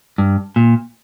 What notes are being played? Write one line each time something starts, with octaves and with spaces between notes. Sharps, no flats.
G2
A#2